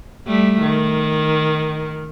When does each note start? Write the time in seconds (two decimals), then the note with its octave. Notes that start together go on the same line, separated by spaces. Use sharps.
0.27 G3 A3
0.62 D#3